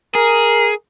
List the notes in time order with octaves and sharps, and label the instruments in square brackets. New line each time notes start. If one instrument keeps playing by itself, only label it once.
[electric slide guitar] G#4 [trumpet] A#4